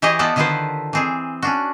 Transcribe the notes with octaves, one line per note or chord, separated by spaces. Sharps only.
E3 E4 G4 G#4 C#5 D#5
B3 F4 A4 C5 D5 A5
D3 D#3 E4 F4 B4 C5
E3 C4 G#4
C#4 D4 F#4